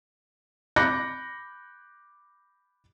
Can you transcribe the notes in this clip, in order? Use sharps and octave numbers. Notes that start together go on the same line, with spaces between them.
B5 D6 F#6 G6 A#6 C#7